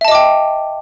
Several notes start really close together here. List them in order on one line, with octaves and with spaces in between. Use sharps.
E5 A5 D#5 D6 G5